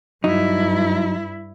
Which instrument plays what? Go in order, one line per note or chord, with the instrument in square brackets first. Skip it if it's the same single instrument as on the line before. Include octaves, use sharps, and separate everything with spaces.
[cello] G2 E4 [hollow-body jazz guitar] F#3 D#4